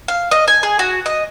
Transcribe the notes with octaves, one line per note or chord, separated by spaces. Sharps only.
F5
D#5
G#5
G#4
F#4
D#5